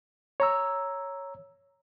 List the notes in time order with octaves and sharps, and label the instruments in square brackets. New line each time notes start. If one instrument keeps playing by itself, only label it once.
[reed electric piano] C#5 A#5 E6